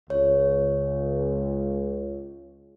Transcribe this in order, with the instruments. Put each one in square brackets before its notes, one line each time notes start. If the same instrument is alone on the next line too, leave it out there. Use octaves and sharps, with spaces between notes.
[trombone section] C#2 [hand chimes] C#5